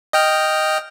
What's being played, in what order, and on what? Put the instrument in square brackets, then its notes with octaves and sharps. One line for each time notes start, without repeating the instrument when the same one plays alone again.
[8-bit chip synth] D#5 G5 F6